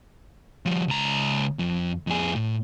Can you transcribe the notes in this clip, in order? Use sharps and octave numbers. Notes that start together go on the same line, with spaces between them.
F3 G3
C#2 A#5
F2
F2 G#4
A2